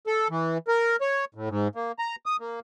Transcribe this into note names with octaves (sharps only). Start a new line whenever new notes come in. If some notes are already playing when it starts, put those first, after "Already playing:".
A4
E3
A#4
C#5
A2
G#2
A#3
A#5
D#6
A#3